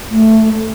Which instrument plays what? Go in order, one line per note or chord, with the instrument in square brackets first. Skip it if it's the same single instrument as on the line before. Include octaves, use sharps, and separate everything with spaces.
[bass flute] A3